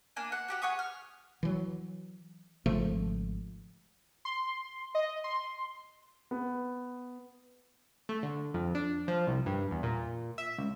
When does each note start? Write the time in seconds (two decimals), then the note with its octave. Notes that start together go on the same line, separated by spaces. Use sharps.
0.16 A#3 D4 G#5
0.32 F#5
0.48 F#4 G4 F#5
0.62 G#4 F#5 C#6 D#6
0.79 F6
1.43 E3 F#3
2.66 G#1 C#3 F3 A3
4.25 C6
4.95 D#5
5.24 C6
6.31 B3
8.09 A3
8.23 D3
8.54 F2
8.75 D4
9.08 F3
9.27 C2
9.46 G2
9.71 E2
9.83 A#2
10.38 E5
10.58 C#2